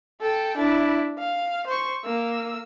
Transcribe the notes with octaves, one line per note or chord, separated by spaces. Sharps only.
A4 G5
D4 E4
F5
C5 C#6
A#3 E6